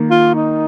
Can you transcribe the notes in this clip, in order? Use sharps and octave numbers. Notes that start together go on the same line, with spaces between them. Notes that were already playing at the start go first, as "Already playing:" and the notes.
Already playing: D#3 A#3
F4
D#4